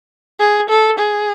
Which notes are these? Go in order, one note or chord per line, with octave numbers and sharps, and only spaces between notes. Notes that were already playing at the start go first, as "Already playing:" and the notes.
G#4
A4
G#4